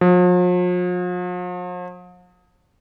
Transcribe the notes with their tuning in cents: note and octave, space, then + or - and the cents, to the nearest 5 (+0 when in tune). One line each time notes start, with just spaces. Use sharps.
F3 +45